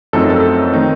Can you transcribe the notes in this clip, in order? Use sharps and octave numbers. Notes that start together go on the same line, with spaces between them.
F#2 F3 A3 C4 D#4 A4
A4
D#3 A3 C4 D#4